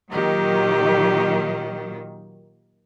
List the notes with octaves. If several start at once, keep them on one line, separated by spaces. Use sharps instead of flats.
A#2 D#3 F#3 G4